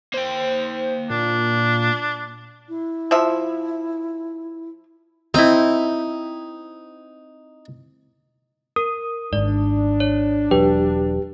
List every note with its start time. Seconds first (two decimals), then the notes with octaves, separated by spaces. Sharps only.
0.14 A#3 C5 G5
1.10 A#2 D4
2.69 E4
3.11 F3 E5
5.34 C4 D#4 E4
8.76 A#4 D#6
9.33 G#1 G#2 D4 D5
10.00 C#5
10.51 E1 F#3 G4 B4